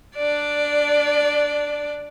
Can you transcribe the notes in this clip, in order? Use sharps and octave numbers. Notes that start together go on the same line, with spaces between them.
D4 D5